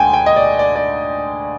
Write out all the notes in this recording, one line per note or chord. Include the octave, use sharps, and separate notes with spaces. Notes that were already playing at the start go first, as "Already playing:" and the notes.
Already playing: D2 D3 G#3 G5 G#5
G5
D#5
D5
D5
D5